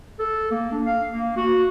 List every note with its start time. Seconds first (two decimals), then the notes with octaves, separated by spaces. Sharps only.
0.19 A4
0.51 A#3
0.71 D4
0.85 F5
1.11 A#3
1.36 F#4